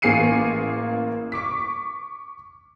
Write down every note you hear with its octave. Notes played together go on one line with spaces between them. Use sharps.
A1 A#3 G#4 C7 C#7 D#7
C#6 D6 B6